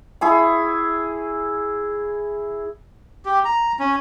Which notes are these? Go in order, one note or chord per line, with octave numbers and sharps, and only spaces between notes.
E4 G#4 C#6
G4
A#5
C#4